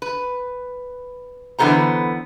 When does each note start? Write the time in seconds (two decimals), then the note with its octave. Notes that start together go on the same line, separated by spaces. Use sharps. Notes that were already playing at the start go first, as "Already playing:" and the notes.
0.02 B4
1.59 D3 E3 B3 A4 C5 A#5